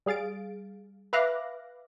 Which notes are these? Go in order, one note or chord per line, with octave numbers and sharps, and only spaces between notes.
G3 G#4 F5 A6 D7
B4 E5 F5 D6 F#6 A#6